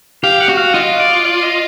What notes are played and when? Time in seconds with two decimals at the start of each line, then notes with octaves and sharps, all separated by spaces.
0.23 G4 F5
0.41 F#5
0.49 F#4
0.57 F5
0.74 F4 D#5
1.00 D5
1.25 D5
1.43 D#5